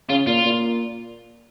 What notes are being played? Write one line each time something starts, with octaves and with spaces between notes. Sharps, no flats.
C#3 F4
A#2 F4
A#2